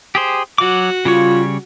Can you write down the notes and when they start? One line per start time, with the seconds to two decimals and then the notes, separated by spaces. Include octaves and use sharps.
0.15 G4 G#4 C5
0.58 F#3 F#4 D6
1.05 C#3 G3 F4 C#5